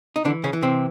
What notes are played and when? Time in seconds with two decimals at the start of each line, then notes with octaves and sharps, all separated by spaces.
0.16 D#4
0.25 D3 E3 D4
0.44 C#3 C#4
0.53 E3
0.62 C3 C4